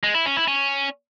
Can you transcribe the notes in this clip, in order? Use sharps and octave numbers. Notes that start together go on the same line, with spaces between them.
G#3
E4
C#4
E4
C#4